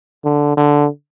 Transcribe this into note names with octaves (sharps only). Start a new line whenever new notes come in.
D3
D3